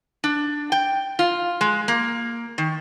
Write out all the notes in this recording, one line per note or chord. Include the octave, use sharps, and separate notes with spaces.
D4
G5
F4
G#3
A#3
D#3